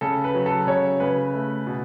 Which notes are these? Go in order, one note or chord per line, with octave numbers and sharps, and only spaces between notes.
C#3 A4
B4
F#3
A4
C#3 C#5
C#3 B4
A3
B2